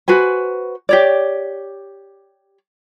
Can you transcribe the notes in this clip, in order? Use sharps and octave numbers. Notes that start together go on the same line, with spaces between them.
F#4 B4 C5 G#5
G4 C#5 D5